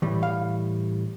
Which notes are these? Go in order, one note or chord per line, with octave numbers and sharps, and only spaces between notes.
A2 E3 G3
F5